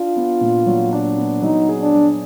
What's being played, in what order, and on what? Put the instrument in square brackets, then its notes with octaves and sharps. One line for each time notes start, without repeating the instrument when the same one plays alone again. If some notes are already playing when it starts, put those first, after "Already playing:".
Already playing: [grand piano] D4 [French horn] F4
[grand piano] B3
A#2
F#3
D4
B3
[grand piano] F#3 [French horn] D#4
[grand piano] G#4
[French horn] D4
[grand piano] F#3